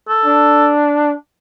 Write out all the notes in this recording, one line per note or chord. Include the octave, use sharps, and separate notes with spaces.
A4
D4